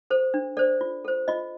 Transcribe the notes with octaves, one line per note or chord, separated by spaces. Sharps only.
A4 C5
D4
A4 C5 D5
F4
A4 C5
F4 D#5